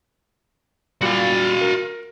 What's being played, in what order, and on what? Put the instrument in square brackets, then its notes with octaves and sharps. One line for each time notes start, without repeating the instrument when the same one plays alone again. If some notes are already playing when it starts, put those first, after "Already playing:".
[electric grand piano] A#2 G3 [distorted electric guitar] F#4 F5
[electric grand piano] A#4